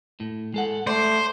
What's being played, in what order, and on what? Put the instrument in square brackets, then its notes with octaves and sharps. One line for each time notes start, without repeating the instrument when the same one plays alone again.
[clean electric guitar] A2
G#3 A4 F#5
[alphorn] A3 [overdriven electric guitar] C5 [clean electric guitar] D5